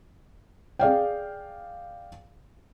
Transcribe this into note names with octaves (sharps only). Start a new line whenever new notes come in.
G#4 D5 F5 G5